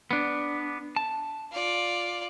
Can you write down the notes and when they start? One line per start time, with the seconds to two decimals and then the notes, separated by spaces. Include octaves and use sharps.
0.11 B3 D4
0.96 A5
1.52 F4 D5